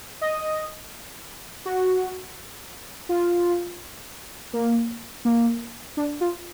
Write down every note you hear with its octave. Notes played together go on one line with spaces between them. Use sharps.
D#5
F#4
F4
A#3
A#3
D4
F4